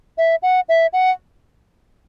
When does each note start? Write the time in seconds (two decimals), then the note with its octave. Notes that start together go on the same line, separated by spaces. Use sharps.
0.18 E5
0.43 F#5
0.69 E5
0.93 F#5